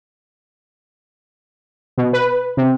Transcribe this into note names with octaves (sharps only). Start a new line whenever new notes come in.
B2
B4
C3